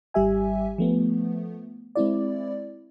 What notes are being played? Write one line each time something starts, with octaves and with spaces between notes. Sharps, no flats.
G#1 G3 G4 E5 G#5
F3 A3 B3
G#3 C4 E4 D5